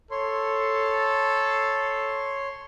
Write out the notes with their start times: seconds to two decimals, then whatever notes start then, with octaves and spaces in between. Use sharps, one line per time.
0.11 A4 C#5 C6